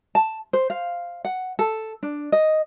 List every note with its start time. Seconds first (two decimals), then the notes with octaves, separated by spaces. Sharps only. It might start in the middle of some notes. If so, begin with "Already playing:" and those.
0.15 A5
0.53 C5
0.70 F5
1.25 F#5
1.59 A4
2.03 D4
2.32 D#5